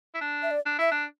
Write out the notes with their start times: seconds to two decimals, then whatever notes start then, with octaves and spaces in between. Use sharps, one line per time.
0.15 E4
0.21 D4
0.43 E5
0.51 D5
0.66 D4
0.79 E4 E5
0.91 D4